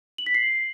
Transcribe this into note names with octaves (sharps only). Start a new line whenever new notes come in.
F#7
B6
C7